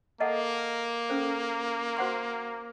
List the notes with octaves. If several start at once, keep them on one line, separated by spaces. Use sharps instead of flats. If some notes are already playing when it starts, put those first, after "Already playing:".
A#3 A4 D#5 F#5 A5
C#4 A4 C5
F#4 C5 F#5 C6